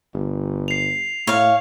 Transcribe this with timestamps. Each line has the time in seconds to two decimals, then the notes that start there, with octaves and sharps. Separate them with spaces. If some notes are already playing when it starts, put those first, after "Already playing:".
0.14 G1
0.68 C7 F7
1.27 A2 C#5 F5